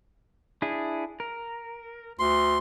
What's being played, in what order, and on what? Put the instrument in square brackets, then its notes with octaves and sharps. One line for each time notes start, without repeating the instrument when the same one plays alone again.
[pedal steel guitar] D4 E4 G#4
A#4
[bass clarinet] D2 [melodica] C6